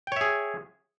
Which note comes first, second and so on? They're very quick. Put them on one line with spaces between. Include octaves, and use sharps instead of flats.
G5 C#5 E5 G#4